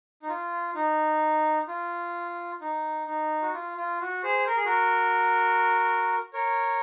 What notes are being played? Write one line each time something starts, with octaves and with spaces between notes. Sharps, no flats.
D#4
F4
D#4
F4
D#4
D#4
F#4
F4
F4
F#4
G#4 C5
A#4
G#4
F#4 A#4
A#4 C#5